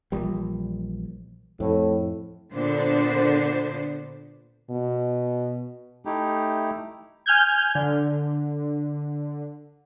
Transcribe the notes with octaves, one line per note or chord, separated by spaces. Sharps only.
A#1 E3 G3
F2 A2
A#2 D3 B3 D4 C5
B2
A3 D#4 E4 G4
G#5 F6 G6 G#6
D3